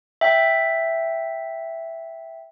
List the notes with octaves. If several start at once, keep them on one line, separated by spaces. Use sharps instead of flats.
E5 G5